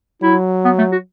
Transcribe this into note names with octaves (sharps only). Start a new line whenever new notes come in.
F#3 E4
B3
A3
F#4